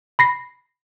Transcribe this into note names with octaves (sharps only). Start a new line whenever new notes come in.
B5 A#6 C7